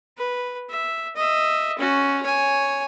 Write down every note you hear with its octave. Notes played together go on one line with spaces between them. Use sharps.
B4
E5
D#5 E5
C#4 F#4
C#5 G#5